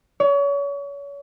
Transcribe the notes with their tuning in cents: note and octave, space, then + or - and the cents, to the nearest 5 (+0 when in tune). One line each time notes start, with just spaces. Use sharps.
C#5 +35